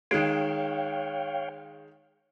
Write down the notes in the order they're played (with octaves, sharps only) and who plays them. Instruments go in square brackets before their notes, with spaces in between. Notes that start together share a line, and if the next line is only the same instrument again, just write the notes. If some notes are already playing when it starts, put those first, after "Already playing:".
[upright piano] D#3 G#3 [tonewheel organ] C#5 F5 G5